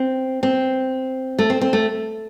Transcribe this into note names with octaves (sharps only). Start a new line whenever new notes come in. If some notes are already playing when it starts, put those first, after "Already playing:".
Already playing: C4
C4
A3
C4
C4
A3